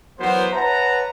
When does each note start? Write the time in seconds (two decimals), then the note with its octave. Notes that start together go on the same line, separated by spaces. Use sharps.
0.19 E3 F#3 B3 A#4 C5
0.53 B4 C#5 E5 F#5 A5 A#5